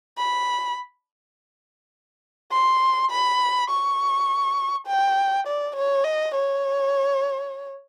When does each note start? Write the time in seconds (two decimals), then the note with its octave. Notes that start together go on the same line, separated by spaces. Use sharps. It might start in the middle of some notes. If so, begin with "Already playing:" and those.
0.18 B5
2.52 C6
3.11 B5
3.70 C#6
4.87 G5
5.47 D5
5.76 C#5
6.04 D#5
6.35 C#5